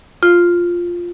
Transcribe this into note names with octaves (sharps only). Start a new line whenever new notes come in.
F4